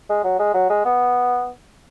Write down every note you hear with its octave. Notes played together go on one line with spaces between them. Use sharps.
G#3
F#3
G#3
F#3
G#3
B3